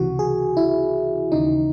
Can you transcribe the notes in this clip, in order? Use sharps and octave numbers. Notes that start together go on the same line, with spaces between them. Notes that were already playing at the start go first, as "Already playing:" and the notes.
Already playing: C#2 C3 E3 F#4
G#4
E4
D#2 C#3 E3 D#4